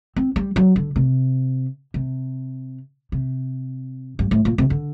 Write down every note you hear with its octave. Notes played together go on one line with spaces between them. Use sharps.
C4
G3
F#3
D3
C3
C3
C3
G2
A2
A#2
C3
D3